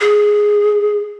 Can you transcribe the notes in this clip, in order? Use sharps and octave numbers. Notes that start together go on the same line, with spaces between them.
G#4